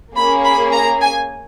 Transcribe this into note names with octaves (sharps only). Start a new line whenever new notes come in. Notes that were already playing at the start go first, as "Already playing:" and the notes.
A#3 C#4 G#4 B5
B5
A#5
G#5